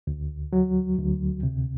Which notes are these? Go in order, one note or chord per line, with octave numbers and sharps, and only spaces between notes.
D2
F#3
D2
C3